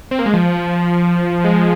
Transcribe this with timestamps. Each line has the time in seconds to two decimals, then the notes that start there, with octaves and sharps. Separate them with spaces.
0.11 C4
0.19 A#3
0.26 G#3
0.34 F3
0.52 F3
1.44 G#3